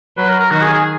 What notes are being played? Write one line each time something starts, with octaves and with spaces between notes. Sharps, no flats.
F#3 B4
A#4
A#4
D#3 F#4
G#4
G#4